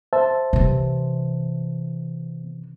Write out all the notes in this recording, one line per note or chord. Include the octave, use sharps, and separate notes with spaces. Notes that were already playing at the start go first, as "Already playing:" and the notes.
C5 E5 A5
C3 E3